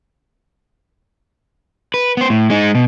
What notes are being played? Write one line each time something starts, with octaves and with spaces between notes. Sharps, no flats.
B4
B3 C5
A2
G#3 D#4
B2